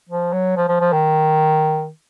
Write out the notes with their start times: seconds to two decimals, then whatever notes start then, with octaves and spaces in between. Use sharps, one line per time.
0.09 F3
0.33 F#3
0.57 F3
0.68 F3
0.80 F3
0.93 D#3